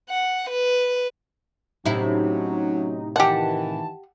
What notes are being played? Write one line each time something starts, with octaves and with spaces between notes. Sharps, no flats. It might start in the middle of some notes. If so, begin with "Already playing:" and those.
F#5
B4
A2 C3 F#3 C#4 D#4 E4
D#3 E3 G4 F#5 A5